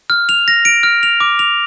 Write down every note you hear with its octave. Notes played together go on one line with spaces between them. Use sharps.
F6
F7
A#6
D7
F6
F7
D6
F7